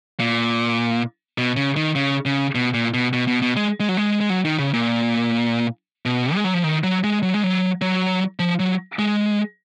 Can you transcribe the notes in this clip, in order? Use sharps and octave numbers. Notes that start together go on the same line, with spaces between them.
A#2
B2
C#3
D#3
C#3
C#3
B2
A#2
B2
B2
B2
B2
G#3
G#3
F#3
G#3
G#3
F#3
D#3
C#3
A#2
B2
G#3
F#3
F3
D#3
F#3
G#3
F#3
G#3
F#3
F#3
F3
F#3
G#3